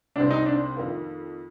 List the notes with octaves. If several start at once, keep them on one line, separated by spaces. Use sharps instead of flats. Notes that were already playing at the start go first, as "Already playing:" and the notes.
C2 C3 G3 C4 D4
D#4
D4
F2 D#3 A#3